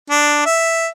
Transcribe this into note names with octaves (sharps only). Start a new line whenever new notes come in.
D4
E5